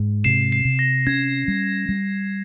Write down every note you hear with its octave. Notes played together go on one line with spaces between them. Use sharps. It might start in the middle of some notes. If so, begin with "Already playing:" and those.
Already playing: G#2
C3 C7 E7
C7
C3
A#6
C#4 G#6
G3
G3